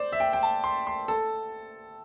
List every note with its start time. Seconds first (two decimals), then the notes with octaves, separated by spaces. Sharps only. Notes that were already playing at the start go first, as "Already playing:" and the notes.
Already playing: C5 D5
0.12 E5
0.20 G5
0.33 G5
0.43 A5
0.64 C6
0.87 C6
1.08 A4